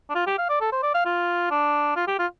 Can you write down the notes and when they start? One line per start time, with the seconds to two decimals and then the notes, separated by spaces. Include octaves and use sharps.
0.10 D4
0.15 F4
0.27 G4
0.38 F5
0.49 D5
0.61 A4
0.72 C5
0.83 D5
0.94 F5
1.05 F4
1.51 D4
1.96 F4
2.07 G4
2.19 F4